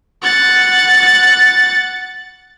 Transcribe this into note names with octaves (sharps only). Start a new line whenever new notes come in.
F#5 A6